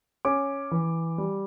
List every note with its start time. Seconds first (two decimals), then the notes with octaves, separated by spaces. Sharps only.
0.25 C#4 D6
0.71 E3
1.18 G3